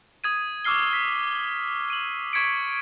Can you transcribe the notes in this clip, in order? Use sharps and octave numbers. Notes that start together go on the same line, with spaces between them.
D#6 G#6 D#7
C#6 D6 E6 F6 C7 G7
B6
D#7 F#7
C#6 G#6 B6 C#7 D7